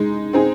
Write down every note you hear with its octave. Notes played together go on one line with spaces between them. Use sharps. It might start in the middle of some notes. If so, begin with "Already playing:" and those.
Already playing: G#3 D#4
C4 D#4 G#4